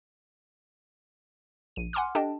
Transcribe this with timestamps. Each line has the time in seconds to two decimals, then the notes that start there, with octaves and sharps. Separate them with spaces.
1.76 A#1 D#7
1.93 F#5 G#5 C6 D6 F6
2.15 D4 G4 A4 D#5 G5 A5